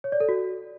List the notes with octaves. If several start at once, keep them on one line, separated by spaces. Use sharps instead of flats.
C#5
D5
A4
F#4